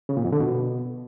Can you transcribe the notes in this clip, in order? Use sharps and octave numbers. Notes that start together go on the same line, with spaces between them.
C#3
A#2
F2
D3
B2